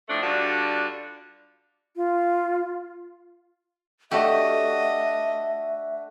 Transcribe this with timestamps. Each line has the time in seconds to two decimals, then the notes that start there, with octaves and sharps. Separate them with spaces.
0.08 A2 F3 A3 D4
0.22 D3 G3 D4 F4 F#4
1.96 F4
4.11 A3 D4 F#4 G4 A4 D#5 E5